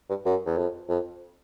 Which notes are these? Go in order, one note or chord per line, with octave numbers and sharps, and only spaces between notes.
G2
F#2
E2
F2
F2